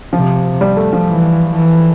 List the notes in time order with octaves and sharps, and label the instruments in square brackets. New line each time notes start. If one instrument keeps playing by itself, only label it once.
[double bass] C3 [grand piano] F3
[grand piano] G3
A3
F3
[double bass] E3
E3